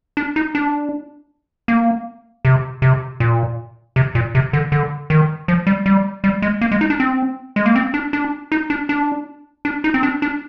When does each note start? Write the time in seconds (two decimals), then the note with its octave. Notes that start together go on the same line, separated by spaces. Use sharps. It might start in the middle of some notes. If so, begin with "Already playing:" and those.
0.17 D4
0.36 D#4
0.55 D4
1.68 A#3
2.45 C3
2.82 C3
3.20 A#2
3.96 C3
4.15 A#2
4.35 C3
4.53 D3
4.72 D3
5.10 D#3
5.48 F3
5.67 G3
5.86 G3
6.24 G3
6.42 G#3
6.61 A#3
6.72 G#3
6.81 D#4
6.90 D4
7.00 C4
7.56 G#3
7.66 A#3
7.76 C4
7.94 D4
8.13 D4
8.52 D#4
8.70 D4
8.89 D4
9.65 D4
9.84 D#4
9.94 C4
10.03 D4
10.22 D4